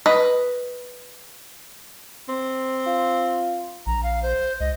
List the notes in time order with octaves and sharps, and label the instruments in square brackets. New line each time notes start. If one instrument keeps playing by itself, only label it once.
[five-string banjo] B4 D#5
[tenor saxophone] C4
[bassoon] F4
[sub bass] A#1 [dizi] A#5
[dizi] F5
C5
[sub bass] C#2 [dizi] D#5